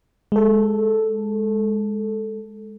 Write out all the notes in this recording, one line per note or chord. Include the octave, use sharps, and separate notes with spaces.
G#3 A4